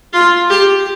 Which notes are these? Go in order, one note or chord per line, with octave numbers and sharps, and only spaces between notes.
F4
G4